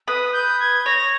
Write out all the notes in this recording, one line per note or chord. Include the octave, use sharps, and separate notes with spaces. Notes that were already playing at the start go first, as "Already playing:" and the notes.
B4 D#6
G6
G#6
C#5 A#6